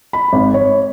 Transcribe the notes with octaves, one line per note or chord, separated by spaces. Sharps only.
B5
G#1
C#5